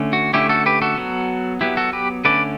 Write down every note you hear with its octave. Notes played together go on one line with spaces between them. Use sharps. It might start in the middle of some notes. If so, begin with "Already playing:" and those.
Already playing: D3 A3 C#4
F#4
D3 A3 C#4 E4 G4
F#4 A4
G4 B4
F#4 A4
F#3 B3
F#3 B3 E4 G4
F#4 A4
G4 B4
D3 A3 C#4 B4 D5